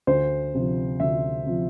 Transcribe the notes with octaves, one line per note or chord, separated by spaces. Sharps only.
D2 C5
C3 F3
D2 E5
C3 F3